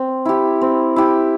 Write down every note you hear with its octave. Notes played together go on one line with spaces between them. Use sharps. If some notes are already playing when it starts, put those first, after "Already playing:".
Already playing: C4
E4 G4
C4
E4 G4